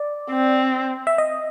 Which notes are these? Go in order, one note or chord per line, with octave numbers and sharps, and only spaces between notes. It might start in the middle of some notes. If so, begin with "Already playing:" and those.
Already playing: D5
C4
E5
D#5